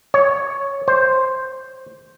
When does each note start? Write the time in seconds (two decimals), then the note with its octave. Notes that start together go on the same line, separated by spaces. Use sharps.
0.14 C#5
0.88 C5